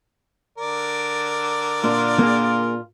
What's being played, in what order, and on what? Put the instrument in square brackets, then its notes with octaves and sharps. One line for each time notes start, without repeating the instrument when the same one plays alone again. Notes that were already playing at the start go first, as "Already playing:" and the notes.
[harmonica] D3 A#4 D5
[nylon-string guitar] A#2 D4 [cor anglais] F4
[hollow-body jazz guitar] A#3 G#4